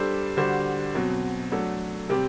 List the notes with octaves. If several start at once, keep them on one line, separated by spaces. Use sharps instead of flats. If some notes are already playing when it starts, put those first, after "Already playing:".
Already playing: G3 D4 A4 C5
D3 G3 D4 F#4 C5
B2 F#3 C4
F#3 A3 D4 A4
C3 G3 C4 G4